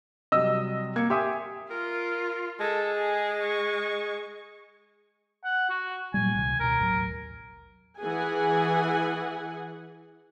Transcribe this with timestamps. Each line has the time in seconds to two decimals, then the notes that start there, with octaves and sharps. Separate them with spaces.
0.32 C3 F#3 G3 D#5 E6
0.96 A#3 G#6 C#7
1.10 G4 E5 G5 G#5 C6 D#6
1.71 F4 A#4
2.60 G#3 A4
2.97 G#4
3.43 C#6
5.45 F#5
5.69 F#4
6.14 A#2 F#3 G3 G#5
6.35 C#2 C3 D#3
6.60 C#2 B2 A#4
6.79 A1 D#2 F#3
7.99 E3 G#4 F#5 G#5